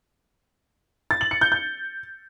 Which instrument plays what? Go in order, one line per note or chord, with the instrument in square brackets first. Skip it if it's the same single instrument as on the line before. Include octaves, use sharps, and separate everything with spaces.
[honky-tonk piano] A6
F#7
C#7
G6
G6